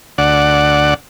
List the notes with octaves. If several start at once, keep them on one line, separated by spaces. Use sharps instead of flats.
D2 D5 F#5